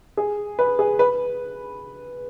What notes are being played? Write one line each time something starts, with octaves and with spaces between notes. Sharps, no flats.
G#4
B4
G#4
B4